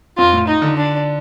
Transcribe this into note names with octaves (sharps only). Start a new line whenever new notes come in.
F2 F4
A2
D#4
D3
D4